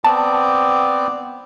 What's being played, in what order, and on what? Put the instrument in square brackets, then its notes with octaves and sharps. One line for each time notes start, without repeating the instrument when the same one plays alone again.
[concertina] B3 C4 D5 [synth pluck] A5